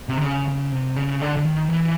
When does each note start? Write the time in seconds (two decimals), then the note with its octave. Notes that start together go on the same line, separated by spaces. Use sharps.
0.09 C3
0.17 D3
0.24 C#3
0.48 C#3
0.72 C3
0.96 C#3
1.21 D3
1.37 D3
1.45 D#3
1.68 E3